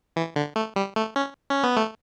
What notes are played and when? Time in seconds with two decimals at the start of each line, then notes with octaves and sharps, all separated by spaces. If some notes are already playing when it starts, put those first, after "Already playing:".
0.16 E3
0.36 D3
0.56 A3
0.76 G3
0.96 A3
1.16 C#4
1.50 C#4
1.63 B3
1.77 A3